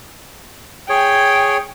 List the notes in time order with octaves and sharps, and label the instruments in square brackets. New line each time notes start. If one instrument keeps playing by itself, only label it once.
[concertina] G#4 C#5 [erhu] G5